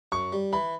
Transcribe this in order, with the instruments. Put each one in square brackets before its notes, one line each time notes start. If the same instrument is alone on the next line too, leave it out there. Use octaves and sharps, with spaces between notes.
[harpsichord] F#2 [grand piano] C#6
[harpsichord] G3
[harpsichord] E3 [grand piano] B5